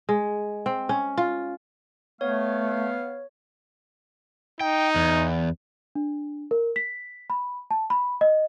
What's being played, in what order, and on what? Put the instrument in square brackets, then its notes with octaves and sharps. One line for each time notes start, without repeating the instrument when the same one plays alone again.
[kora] G#3
C4
C#4
F4
[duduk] A3 [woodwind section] B3 F5 [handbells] C#5
[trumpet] D#4 [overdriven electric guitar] G5
[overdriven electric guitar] E2
[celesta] D4
A#4
B6
B5
A5
B5
D#5